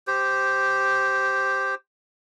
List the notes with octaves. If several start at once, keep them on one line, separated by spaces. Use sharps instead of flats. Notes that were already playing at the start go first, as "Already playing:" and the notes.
G4 C5